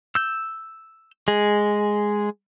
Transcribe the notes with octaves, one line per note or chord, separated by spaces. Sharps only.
E6 G6
G#3 G#4